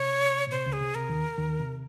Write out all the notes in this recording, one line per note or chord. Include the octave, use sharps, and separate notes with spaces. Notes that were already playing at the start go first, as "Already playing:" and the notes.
Already playing: C3 C#5
A#2
C3 C5
C#2 C#3
G#4
C3
C3 A#4
D#2 D#3
D#2 D#3
C3